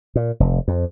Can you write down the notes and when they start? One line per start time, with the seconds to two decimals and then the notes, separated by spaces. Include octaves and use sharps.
0.16 A#2
0.40 F1
0.68 F2